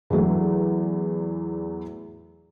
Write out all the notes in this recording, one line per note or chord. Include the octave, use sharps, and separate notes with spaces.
E2 E3 F#3 A3